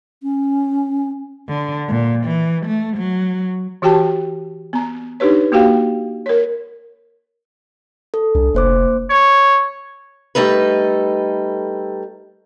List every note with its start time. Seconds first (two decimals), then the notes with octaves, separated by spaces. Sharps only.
0.23 C#4
1.49 D3
1.88 A#2
2.24 E3
2.66 A3
2.97 F#3
3.82 E3 F#4 G4 G5 A5
4.73 B3 A#5
5.20 D4 D#4 G4 B4 C#5
5.52 A#3 F#4 G4 F5 G5
6.26 A#4 C#5
8.14 A4
8.35 C2 D4
8.54 F1 A#3 C5 D6
9.10 C#5
10.35 G3 A3 D#4 A4 B4